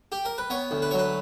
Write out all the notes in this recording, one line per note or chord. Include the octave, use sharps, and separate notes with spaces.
G4
A#4
B4
B3 C#5
D2
B4
F#3 C#5
B4